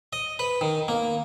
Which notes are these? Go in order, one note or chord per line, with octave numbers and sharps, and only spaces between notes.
D#5
B4
D#3
A#3